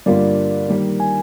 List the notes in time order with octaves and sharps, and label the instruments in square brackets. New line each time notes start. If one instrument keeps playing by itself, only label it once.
[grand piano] G2 D3 G3 A#3 F4 [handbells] D5
[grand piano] D#3 G3 A#3
[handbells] G#5